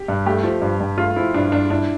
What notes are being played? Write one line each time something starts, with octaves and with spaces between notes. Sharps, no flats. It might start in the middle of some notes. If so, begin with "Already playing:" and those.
Already playing: G4
G2
A3 G4
F3
G2
G2
A3 F4
F3 E4
G2 D4
G2 D4
D4 E4